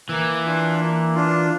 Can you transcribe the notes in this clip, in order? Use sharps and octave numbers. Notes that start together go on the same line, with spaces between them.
E3 A#3
D4 F4
A#3
D4 F4